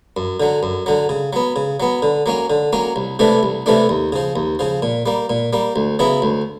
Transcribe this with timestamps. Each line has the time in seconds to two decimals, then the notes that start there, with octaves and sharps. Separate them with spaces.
0.17 F#2
0.40 D3 F#3
0.63 F#2
0.86 D3 F#3
1.09 C#3
1.33 F#3 B3
1.56 C#3
1.80 F#3 B3
2.02 D3
2.26 F#3 A#3 C#4
2.50 D3
2.73 F#3 A#3 C#4
2.96 C2
3.19 C3 E3 A3 D4
3.43 C2
3.66 C3 E3 A3 D4
3.89 D#2
4.12 C#3 F3
4.36 D#2
4.59 C#3 F3
4.82 A#2
5.06 G3 A#3
5.30 A#2
5.53 G3 A#3
5.76 D2
5.99 C#3 F#3 B3 E4
6.22 D2